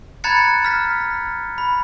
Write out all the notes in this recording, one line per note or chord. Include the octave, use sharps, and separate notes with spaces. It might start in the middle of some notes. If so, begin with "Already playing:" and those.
A#5 B5 F#6 G#6 A6 C#7
F6 B6
B5